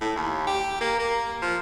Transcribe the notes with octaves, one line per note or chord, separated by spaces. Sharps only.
A2
D#2
G4
A#3
A#3
F3